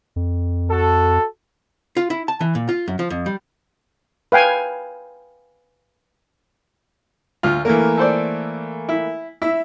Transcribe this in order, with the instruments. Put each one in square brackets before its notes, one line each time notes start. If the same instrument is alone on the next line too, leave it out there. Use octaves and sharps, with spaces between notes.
[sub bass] F2
[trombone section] F#4 A4
[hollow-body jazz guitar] F4
E4
A5
E3
A#2
F4
F#2
F3
F2
G3
[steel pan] B4 F5 G5 G#5
[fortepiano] D2 F4 [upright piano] F6
[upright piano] E3 A3 A#3 [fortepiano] A#4
[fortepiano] A4 C5 D5
E4
[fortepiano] E4 [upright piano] E5